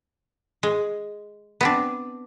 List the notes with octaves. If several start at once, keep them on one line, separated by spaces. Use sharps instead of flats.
G#3
B3 C4 D4